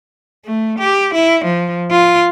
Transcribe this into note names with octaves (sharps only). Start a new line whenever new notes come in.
A3
G4
E4
F3
F4